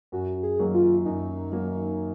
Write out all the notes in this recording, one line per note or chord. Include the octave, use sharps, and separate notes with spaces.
F#2 F#4
G#4
D#3 F#3 A#3
F4
F#2 D#4
D#3 F#3 A#3